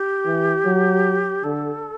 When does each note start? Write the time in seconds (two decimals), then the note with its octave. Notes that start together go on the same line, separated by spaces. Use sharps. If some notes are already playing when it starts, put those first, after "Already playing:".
Already playing: G4
0.26 E3
0.65 F#3
1.44 D3 A4